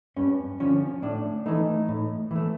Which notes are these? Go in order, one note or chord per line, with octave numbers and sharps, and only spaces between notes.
G2 C#4
D3 F3 C#4
A2 D4
E3 A3 D#4
A2
E3 A3